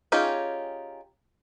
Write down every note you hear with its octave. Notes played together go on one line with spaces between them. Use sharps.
C#4 D#4 F4 G4 G#4